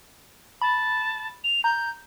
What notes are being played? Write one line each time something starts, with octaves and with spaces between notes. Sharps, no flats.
A5 B5
F7
A#5 G6